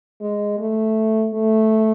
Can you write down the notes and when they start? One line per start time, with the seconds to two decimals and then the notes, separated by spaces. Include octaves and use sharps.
0.21 G#3
0.59 A3
1.34 A3